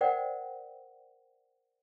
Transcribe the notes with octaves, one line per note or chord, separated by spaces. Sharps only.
A#4 C5 D5 F#5 G5